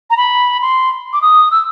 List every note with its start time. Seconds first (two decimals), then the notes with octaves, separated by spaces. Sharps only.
0.10 A#5
0.17 B5
0.62 C6
1.13 D6
1.22 D#6
1.51 E6